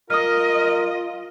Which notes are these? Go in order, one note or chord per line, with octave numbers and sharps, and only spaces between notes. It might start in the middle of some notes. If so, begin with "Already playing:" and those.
F4 A#4 D#5 D#6 F6